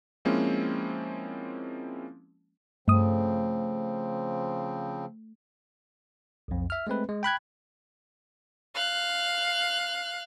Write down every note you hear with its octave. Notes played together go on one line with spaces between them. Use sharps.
F3 G#3 A#3 C4 C#4 E4
G2 C#3 F3 A3 C4 D#6
B1 F2
E5 F6
G#3 A3 C4 B4
G#3
G5 B5 F#6 G#6
F5 F#6